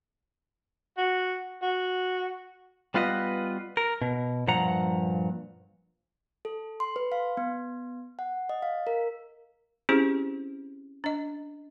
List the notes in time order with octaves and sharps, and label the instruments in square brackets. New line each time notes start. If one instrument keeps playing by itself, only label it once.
[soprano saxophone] F#4
F#4
[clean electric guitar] G3 B3 F4 B4 D#5
A#4
B2
G2 A#2 F3 F#5 A#5
[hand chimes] A4
C6
B4
F5
B3
F#5
D#5
F5
A#4
[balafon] C4 C#4 E4 G4 G#4 C5
D4 D#5